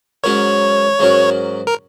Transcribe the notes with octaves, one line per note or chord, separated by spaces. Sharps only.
G#2 F#3 C#4 F#4 A#4 C#5
G#2 F#3 C#4 F#4 A#4
A#4